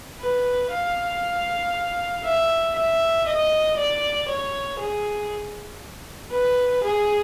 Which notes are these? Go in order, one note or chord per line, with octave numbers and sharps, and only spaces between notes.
B4
F5
E5
E5
D#5
D5
C#5
G#4
B4
G#4